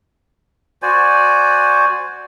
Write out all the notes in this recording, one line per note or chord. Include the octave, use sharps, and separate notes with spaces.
F#4 C5 D5 G#5